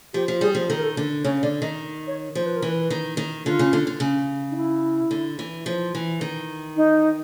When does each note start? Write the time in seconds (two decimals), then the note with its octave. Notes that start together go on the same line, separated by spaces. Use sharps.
0.14 F3 G4
0.28 F3
0.41 G3 G#4
0.55 F3
0.68 D#3 A4
0.77 A#4
0.83 A4
0.97 D3
1.24 C#3 C#5
1.42 D3 D5
1.62 D#3 D#5
2.07 C#5
2.35 F3 C5
2.46 B4
2.56 A#4
2.62 E3 B4
2.90 D#3
3.17 D#3
3.45 D3 F4
3.59 C#3
3.73 D3
3.87 D3
4.00 C#3
4.51 D#4
4.56 E4
5.11 D3
5.39 E3
5.66 F3
5.95 E3
6.21 D#3
6.76 D#4